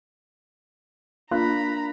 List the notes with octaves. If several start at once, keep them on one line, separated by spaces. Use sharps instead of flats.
A#3 D4 F4 A#5 B5 F#6